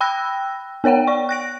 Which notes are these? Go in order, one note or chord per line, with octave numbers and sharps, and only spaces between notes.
G5 B5 E6 F#6 A#6
B3 A#4 C#5 F#5 G5
D5 C#6
F#6 A#6 D7